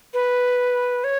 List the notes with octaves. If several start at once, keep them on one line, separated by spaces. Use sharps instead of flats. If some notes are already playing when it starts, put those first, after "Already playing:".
B4
C#5